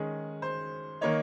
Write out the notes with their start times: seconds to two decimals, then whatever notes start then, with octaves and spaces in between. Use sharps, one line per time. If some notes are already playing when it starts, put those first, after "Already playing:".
Already playing: D#3 G#3 C#4 G#4
0.42 C5
1.01 D#3 A#3 D#4 C#5